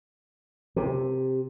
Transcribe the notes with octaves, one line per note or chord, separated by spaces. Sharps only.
C3